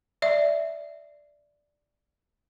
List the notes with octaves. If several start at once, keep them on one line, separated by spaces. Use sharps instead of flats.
D5 E5